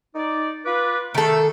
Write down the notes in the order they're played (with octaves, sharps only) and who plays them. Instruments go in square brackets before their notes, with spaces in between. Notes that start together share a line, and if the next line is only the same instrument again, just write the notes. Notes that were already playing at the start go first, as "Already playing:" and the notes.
[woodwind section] D#4 D5
F4 B4 D6
[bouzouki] D#3 A4 [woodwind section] A3